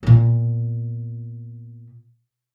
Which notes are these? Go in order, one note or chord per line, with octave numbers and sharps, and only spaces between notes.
A#2 B3